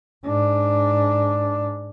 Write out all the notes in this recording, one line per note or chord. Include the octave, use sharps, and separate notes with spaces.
G#2 D4